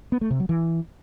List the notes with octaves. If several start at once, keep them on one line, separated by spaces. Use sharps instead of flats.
B3
A3
C3
F#3
E3